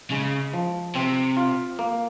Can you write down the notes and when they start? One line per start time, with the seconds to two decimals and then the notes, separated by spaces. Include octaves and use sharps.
0.11 C#3 G#3
0.53 F3
0.95 C3 C4
1.37 F4
1.79 A#3